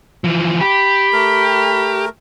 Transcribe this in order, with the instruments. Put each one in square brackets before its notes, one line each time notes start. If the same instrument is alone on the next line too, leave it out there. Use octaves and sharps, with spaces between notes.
[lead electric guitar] E3 F3
[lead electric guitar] G4 [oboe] B5
[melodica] A3 A#4